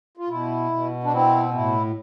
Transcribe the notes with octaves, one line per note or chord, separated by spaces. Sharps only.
F4
B2 E4
B2
D4
C4 E4
A2 E4